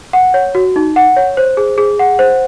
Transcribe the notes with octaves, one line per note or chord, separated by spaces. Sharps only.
F#5
C#5
F#4
D#4
F#5
C#5
C5
G#4
G#4
F#5
C5